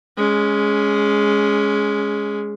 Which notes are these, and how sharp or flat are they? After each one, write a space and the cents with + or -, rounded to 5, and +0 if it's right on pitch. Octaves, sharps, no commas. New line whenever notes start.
G#3 +0 C#4 +15